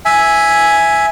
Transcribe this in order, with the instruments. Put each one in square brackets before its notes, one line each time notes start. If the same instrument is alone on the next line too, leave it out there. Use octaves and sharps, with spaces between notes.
[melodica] E5 G#5